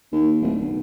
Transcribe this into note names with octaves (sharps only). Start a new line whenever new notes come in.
D#2
D1
B1